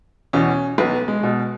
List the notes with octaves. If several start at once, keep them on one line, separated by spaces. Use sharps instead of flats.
E2 B2 C#4
B1 B3
G#3
B2